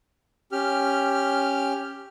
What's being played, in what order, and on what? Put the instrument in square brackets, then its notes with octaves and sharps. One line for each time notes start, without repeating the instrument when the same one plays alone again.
[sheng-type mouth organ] C#4 G4 F6